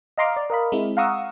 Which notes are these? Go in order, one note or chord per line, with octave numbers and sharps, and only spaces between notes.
D#5 F5 A#5 C6 D6 F6
D5
A#4 D#5 F5 B5
G#3 C4 E4
F5 F#5 A#5 C#6 D#6 E6